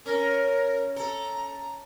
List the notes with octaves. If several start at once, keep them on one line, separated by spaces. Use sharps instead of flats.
C#4 A#4
A4 A#5